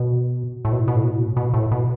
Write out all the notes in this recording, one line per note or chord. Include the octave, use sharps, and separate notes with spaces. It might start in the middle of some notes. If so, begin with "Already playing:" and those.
Already playing: B2
A2
B2
A2
B2
A2
B2
A2
B2
A2
B2
A2
B2